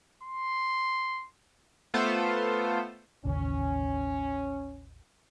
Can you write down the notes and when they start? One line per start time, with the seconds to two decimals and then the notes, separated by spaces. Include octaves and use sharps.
0.23 C6
1.94 A3 B3 F4 A4 C5
3.25 A1 D#2 C#3 C#4